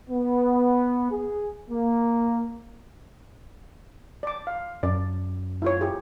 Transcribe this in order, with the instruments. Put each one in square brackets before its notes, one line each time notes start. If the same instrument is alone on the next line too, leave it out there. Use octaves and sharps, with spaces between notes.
[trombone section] B3
G#4
A#3
[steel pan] D5 D6
F5
[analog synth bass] F#2 [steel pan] D5
[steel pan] E4 F4 C#5
E4 G4 G#4